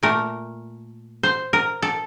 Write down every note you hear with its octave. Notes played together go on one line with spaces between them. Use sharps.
A#2 A3 A#4
C5
A#4
A4